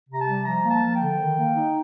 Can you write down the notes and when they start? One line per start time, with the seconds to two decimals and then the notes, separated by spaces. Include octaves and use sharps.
0.08 C3 A#5
0.20 A5
0.26 G3
0.45 F3 A#5
0.63 A#3
0.69 A5
0.81 F3
0.94 G5
1.00 D3
1.19 D#3
1.37 A#3
1.55 D#4